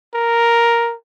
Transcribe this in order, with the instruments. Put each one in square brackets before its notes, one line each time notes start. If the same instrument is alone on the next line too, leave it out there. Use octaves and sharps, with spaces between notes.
[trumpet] A#4